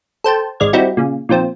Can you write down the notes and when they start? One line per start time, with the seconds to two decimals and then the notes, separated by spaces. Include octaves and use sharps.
0.24 A4 C5 G5 A5
0.60 G#1 G#3 D5 F6 G#6
0.73 G3 C4 D#4 E4 F#4
0.97 A#2 C#3
1.29 A#2 D#3 F3 C4